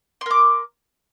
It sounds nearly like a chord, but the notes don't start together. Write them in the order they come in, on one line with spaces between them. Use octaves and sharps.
C6 A#4 D6